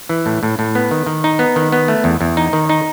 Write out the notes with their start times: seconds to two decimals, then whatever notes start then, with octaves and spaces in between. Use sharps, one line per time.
0.09 E3
0.26 A2
0.43 A2
0.59 A2
0.75 B3
0.91 D#3
1.07 D#3
1.24 D#4
1.39 B3
1.56 D#3
1.72 B3
1.88 A3
2.04 E2
2.21 E2
2.37 D#4
2.53 D#3
2.69 D#4